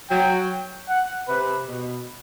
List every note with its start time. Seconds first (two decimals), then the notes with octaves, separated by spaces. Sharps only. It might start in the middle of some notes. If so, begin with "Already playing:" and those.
0.10 F#3 G5
0.89 F#5
1.28 C3 B4
1.68 B2